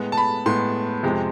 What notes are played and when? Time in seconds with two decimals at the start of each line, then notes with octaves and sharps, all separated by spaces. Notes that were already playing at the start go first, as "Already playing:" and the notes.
Already playing: A2 G#3 B3
0.12 A5
0.17 B5
0.46 A2 G#3 B3 C6
1.03 F2 C3 G#3 C4